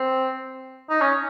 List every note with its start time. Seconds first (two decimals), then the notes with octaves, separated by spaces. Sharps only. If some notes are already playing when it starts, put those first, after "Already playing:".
Already playing: C4
0.90 D#4
1.01 C#4